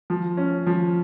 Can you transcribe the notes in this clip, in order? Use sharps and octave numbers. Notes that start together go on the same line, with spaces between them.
F3
C#4
F3